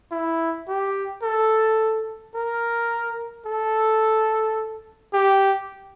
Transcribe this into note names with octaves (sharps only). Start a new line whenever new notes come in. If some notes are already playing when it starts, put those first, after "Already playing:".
E4
G4
A4
A#4
A4
G4